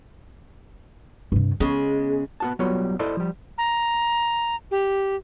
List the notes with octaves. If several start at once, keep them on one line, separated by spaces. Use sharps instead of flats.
G2 C3
C#3 G#3 B3
B3 F#4 A5
F#3 G3 B3 F4 C#5
E4 A4 C5 D5 D#5
F3 G3
A#5
G4